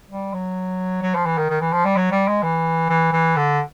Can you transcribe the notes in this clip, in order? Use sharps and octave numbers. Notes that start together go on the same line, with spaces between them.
G3
F#3
F#3
F3
E3
D#3
D#3
E3
F3
G3
F#3
G3
G#3
E3
E3
E3
D3